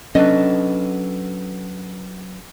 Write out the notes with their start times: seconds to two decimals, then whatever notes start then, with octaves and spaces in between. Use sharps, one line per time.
0.15 F#3 C#4 D4 A4 B4 D#5